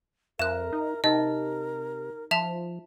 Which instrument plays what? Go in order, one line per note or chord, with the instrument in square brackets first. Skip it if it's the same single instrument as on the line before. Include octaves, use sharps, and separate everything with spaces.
[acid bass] F2 [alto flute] A#4 [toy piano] E5 [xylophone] F#6 E7
[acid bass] D#4
[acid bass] C3 [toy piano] D#4 [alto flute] A#4 [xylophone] D#5
[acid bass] F3 [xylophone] E5 A5 F7